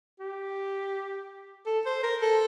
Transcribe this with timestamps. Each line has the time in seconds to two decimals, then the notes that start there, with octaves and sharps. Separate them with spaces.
0.20 G4
1.66 A4
1.86 C5
2.03 A#4
2.22 A4